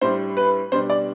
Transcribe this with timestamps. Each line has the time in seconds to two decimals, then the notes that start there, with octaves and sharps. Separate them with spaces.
0.01 A2 G3 D4 C5
0.37 B4
0.72 B2 G3 D4 C5
0.90 D5